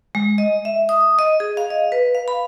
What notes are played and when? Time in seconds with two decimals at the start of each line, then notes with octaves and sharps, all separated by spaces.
0.15 G#3
0.38 D#5
0.65 E5
0.89 D#6
1.19 D#5
1.40 G#4
1.57 F5
1.70 D#5
1.92 B4
2.15 F5
2.28 B5